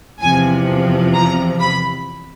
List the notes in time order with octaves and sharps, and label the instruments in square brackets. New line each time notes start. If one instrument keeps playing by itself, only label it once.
[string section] E2 C3 F3 G#5
A#5
B5